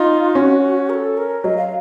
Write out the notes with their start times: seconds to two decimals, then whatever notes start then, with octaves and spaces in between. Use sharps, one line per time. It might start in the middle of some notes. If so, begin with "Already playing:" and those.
Already playing: D#4 F4
0.35 C#4 F#4
0.90 A#4
0.94 A4
1.17 A#4
1.44 F#3 D#5
1.58 F5